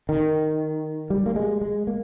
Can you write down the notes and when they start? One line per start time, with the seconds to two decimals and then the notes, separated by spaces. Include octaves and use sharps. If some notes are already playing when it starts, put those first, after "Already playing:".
0.09 D#3
1.10 G3
1.26 A#3
1.36 G#3
1.61 G#3
1.87 A#3